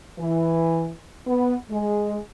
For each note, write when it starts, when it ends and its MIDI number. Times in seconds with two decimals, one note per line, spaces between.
0.18 0.89 52
1.27 1.53 59
1.70 2.16 56